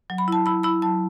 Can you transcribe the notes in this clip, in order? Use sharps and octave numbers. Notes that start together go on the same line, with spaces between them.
F#3
B5
E4 A5
E4 B5
E4 B5
F#3 A5